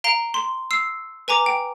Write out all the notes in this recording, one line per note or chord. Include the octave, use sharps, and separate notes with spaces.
F5 A#5 D7 G7
C6
E6 C7
B4 G#5 A#5 D6
G5